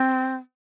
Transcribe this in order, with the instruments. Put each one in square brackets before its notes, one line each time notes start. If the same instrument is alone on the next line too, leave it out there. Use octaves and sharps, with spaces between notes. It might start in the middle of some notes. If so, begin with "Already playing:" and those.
Already playing: [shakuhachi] C4